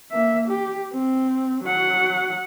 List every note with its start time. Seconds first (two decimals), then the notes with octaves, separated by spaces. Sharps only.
0.12 A#3 E5
0.48 G4
0.94 C4
1.64 F#3 F#5